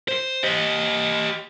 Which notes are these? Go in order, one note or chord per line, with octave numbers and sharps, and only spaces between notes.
C5
G4 D#5